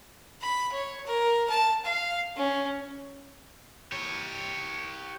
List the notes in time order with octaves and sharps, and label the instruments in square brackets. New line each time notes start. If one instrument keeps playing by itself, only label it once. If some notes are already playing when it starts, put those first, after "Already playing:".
[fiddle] B5
C#5
A#4
A5
F5
C#4
[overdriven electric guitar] G4 C#5